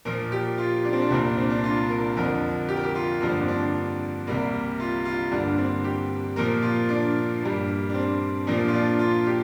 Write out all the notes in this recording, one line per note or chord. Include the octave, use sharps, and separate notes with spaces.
A#2 F3 A#3 A#4
G4
F4
D4
C4
D4
C2 A#2 A#3 C4
D4
C4
D4
F4
A#4
F2 D3 F3 A#4
G4
A#4
G4
F4
G2 D3 F3 A#3 D4
C4
D4
C2 C3 G3 A#3
F4
F4
G2 D3 A#3 D4
C4
G4
A#2 F3 A#3 A#4
F4
D4
G2 G3 A#3
D4
C4
A#2 F3 A#3 D4
F4
D4
F4
G4